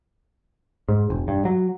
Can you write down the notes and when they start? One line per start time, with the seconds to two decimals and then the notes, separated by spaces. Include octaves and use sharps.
0.88 G#2
1.10 E1
1.28 G2
1.45 F#3